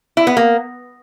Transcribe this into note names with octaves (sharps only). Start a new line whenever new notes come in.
E4
B3
A#3